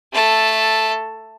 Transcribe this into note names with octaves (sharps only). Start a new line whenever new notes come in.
A3 A4